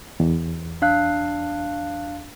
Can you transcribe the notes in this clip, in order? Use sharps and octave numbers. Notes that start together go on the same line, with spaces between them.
E2
D4 F5 F#6